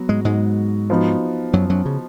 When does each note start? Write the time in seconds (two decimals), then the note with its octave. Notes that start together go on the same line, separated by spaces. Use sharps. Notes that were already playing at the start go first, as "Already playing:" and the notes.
Already playing: F#3 B3 F#4
0.09 G#2 G#3
0.25 G#2 G#3
0.90 F3 B3 D#4 F#4
1.53 F#2 F#3
1.70 F#2 F#3
1.85 C#3